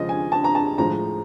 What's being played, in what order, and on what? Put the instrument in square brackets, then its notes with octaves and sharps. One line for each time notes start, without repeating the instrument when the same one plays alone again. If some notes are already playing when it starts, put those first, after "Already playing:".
Already playing: [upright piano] C#3 F3 G#3 D#5
G#5
A5
A#5
A5
A2 F3 G#3 A#5